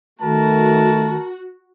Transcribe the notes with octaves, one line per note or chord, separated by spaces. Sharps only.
D#3 A3 F#4 A#4 A5